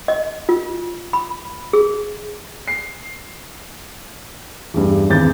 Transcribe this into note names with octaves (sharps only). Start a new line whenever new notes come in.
D#5
F4
B5
G#4
C7
E2 G2
G#1 E2 G6 A6